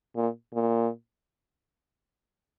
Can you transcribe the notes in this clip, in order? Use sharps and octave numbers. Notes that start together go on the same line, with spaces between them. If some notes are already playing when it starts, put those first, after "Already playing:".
A#2
A#2